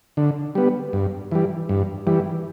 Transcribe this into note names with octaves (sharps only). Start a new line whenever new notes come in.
D3
G3 B3
G2
E3 G3
G2
E3 G3